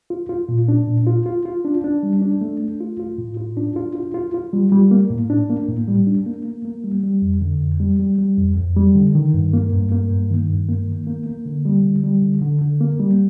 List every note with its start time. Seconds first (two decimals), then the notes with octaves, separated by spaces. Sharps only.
0.10 F4
0.29 F4
0.49 A#2
0.69 D4
0.87 A#2
1.07 F4
1.26 F4
1.46 F4
1.65 D4
1.84 D4
2.03 G3
2.22 D4
2.41 A3
2.60 A3
2.80 F4
3.00 F4
3.18 A2
3.37 F4
3.57 D4
3.76 F4
3.96 F4
4.14 F4
4.34 F4
4.53 G3
4.72 G3
4.91 A#3
5.11 A2
5.30 D4
5.50 A#3
5.68 A2
5.88 G3
6.07 D4
6.27 A#3
6.45 A#3
6.65 A#3
6.84 G3
7.03 G3
7.22 F2
7.41 D3
7.61 F2
7.80 G3
7.99 G3
8.18 G3
8.38 F2
8.57 F2
8.77 G3
8.95 D3
9.15 D#3
9.34 G2
9.53 A#3
9.73 G2
9.92 A#3
10.11 G2
10.31 D#3
10.50 G2
10.69 A#3
10.88 D#3
11.07 A#3
11.26 A#3
11.46 D3
11.65 G3
11.84 D3
12.04 G3
12.22 D3
12.42 D3
12.61 D3
12.80 A#3
13.00 G3